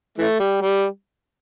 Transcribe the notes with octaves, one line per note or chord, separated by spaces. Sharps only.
E3 A3
G3
G3